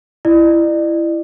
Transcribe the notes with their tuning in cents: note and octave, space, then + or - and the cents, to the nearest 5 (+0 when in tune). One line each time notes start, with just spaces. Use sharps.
E4 +20 D5 +40